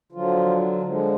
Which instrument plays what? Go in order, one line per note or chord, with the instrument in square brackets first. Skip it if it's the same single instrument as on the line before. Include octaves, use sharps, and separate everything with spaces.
[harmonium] D3 F3 F#3 F4
D3 F3 G#3